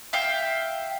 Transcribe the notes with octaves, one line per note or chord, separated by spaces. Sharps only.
E5 F5 G5